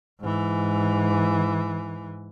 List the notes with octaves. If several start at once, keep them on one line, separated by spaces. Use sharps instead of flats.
G#2 E3